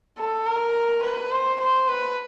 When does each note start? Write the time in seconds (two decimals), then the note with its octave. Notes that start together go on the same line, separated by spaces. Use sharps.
0.18 A4
0.46 A#4
1.03 B4
1.31 C5
1.60 C5
1.88 B4